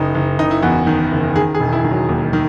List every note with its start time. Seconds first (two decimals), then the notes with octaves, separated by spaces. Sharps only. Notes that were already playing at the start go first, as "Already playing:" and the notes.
Already playing: F#1 D#4
0.15 F#1
0.39 F#1 D#4
0.51 E4
0.62 E2 F#4
0.87 D#3
1.11 F#1
1.36 D#3 G#4
1.55 G#4
1.60 E1
1.72 E4
1.84 D#3
1.91 F#3
2.09 D#2
2.33 D#3